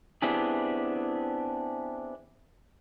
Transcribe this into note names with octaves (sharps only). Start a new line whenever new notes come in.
B3 C4 D4 E4 G4 G#4